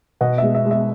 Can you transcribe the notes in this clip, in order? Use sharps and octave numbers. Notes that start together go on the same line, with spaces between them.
B2 D#5 F#5
G#3 E5
E5
G#3
E5